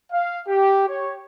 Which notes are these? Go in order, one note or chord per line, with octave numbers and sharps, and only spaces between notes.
F5
G4
C#5